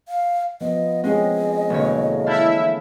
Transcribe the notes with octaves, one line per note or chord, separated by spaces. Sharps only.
F5
F3 B3 D#5
G#3 C4 C#4 G#4 D#5
E1 D3 A#3 C#5
E4 E5 F5 A5 G6